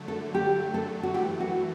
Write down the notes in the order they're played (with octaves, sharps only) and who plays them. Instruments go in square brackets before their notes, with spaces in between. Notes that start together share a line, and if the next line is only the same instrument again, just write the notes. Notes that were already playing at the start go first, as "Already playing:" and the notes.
Already playing: [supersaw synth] D3 F#3 A3
[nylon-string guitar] A4
G4
A4
F#4
[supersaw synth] F#2 E3 A3 [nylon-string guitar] G4
[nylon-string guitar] F#4